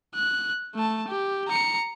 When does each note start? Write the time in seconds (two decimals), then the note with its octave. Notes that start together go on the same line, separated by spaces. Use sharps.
0.15 F#6
0.74 A3 A5
1.08 G4
1.48 A#5 C#7